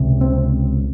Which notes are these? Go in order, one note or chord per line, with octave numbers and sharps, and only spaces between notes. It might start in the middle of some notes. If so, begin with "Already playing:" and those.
Already playing: C#2 C3
C4